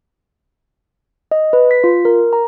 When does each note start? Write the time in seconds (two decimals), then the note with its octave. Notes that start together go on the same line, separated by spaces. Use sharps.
1.31 D#5
1.53 B4
1.71 B6
1.84 F4
2.05 A#4
2.33 A#5